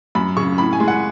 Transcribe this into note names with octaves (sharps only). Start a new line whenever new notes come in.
F#2 B5
C#3 C#6
A2 B5
G#5
G#3
F#5